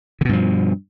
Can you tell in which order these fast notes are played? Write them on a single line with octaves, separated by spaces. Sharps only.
D3 B2 G2 F3